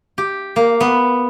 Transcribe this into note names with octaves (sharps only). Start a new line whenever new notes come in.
G4
A#3
B3